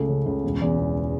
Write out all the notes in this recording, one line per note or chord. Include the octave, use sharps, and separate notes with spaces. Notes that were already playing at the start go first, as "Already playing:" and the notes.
Already playing: C#2 A3
C#3
C#2
E1
E2
E1